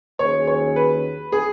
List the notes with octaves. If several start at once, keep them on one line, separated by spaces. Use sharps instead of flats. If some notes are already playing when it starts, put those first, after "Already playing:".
D#2 D#3 F#3 C#4 G#4 C#5
C#5
B4
G#4